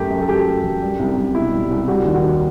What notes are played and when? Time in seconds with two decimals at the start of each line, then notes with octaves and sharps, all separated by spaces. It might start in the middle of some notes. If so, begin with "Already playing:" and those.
Already playing: F#2 A3 G4
0.10 F#2
0.21 A4
0.28 F#3 G4
0.46 A3
0.64 F#2
0.82 G3
0.99 C2
1.17 C2
1.35 B2 E4
1.52 G3
1.70 C2
1.88 G3 F#4
2.05 D#2
2.14 F#4
2.23 D#2